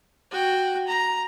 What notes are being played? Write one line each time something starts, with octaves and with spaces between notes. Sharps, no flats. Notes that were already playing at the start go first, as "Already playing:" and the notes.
F#4 G5
A#5